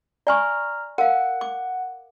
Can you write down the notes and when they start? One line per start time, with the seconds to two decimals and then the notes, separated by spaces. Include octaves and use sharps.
0.27 D5 G#5 A#5 C#6 F6
0.98 A#4 F5 F#5
1.41 D6